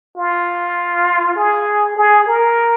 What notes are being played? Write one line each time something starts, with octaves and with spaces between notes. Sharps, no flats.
F4
G#4
G#4
A#4